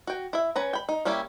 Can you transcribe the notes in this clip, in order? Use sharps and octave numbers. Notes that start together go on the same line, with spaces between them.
F#4 G5
E4 E5
C#4 B4 A#5
G5 B5
D#4
G3 A#3 C#4 E4 G4